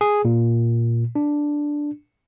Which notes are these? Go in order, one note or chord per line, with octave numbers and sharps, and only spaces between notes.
G#4
A#2
D4